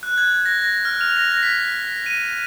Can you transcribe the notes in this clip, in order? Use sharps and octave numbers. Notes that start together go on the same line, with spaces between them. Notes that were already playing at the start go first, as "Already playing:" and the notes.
F#6
G#6
A#6
F6
F7
A#6
B6
D#7